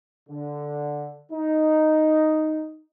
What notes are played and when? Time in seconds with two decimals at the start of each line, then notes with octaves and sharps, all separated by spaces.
0.29 D3
1.32 D#4